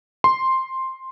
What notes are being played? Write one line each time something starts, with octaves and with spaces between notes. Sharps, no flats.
C6